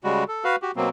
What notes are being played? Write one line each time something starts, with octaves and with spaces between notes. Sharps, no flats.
C#3 G3 G#3 F#4
A4
F#4 B4 F5
F#4 G4
B2 F#3 A#3 C4